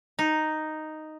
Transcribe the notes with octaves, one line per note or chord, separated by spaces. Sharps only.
D#4